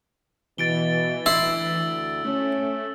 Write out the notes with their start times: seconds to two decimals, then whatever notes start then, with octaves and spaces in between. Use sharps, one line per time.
0.58 B2 E3 A6 D7 G7
1.26 D2 E4 C6 E6
2.25 A3 C#4